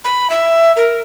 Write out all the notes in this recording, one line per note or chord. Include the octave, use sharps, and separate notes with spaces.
B5
E5
A#4